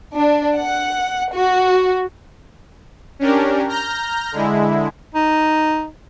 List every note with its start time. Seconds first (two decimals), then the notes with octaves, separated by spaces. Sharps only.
0.14 D4
0.57 F#5
1.31 F#4
3.19 C#4 D4 G4 A#4
3.69 A#5 F6 G6 A#6
4.32 D3 G#3 E4
5.15 D#4